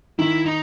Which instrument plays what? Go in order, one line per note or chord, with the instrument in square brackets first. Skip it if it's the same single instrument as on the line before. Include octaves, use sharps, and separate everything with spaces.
[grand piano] D#3 [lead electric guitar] E4
[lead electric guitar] D#4